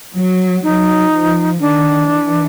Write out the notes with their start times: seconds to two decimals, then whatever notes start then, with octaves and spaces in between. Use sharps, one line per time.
0.15 F#3
0.63 F#3 D#4
1.13 F3
1.60 D#3 D4
2.08 E3